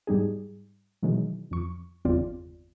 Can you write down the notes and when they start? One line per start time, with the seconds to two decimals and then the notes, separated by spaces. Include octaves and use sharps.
0.07 G#2 G3 D#4 G#4
1.02 B2 D#3 E3 F#3 G#3
1.51 F2 C#6
2.05 G1 E2 C#3 C4 F4 D5